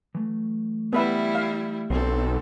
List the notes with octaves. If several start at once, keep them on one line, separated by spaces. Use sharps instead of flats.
E3 F#3 A3
G3 B3 E4 B4 E5
F5
B1 C4 D4 A4 C5